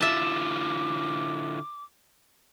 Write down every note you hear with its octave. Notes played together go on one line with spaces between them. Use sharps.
D3 E4 F4 E5 A5 D6